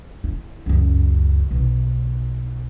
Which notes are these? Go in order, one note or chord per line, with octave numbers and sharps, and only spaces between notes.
E4
C#2 F#2
B1